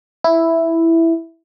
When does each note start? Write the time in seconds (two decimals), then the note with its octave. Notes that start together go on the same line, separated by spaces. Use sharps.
0.24 E4